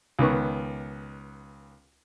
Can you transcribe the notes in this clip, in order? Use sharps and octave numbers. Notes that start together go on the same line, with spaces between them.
C#2 D#3 B3 C#6